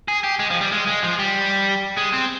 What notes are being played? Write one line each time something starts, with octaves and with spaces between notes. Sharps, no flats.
G#4
G4
G#3
F3
G3
G#3
G#3
F3
G3
G#3
C4